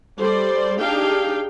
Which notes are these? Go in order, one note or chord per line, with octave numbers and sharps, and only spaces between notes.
G3 A4 C5 D5
D4 D#4 G4 G#4 F5 G5